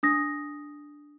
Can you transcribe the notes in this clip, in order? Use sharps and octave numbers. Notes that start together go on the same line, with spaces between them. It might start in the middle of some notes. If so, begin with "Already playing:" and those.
D4 D#6 A#6